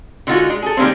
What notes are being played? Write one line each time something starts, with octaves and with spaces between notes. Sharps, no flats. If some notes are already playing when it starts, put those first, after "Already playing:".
D3 G#3 D#4 F4 F#4
G#3
G#4 A4
D#3 G3 G#3 A#3 C4